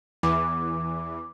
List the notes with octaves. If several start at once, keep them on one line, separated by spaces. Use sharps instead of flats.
E2 E3 D6